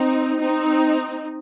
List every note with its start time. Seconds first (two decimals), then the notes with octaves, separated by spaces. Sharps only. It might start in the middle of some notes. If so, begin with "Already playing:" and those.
Already playing: C4 D#4
0.41 C4 D#4